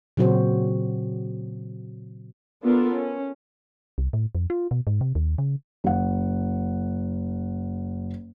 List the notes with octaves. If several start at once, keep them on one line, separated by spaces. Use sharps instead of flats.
A#2 C#3 F#3 C4 F#4 C5
B3 D4 F4 A4 A#4
C#4
C2
A2
F2
F4
B2
G#2
C3
D#2
C#3
F#1 F#5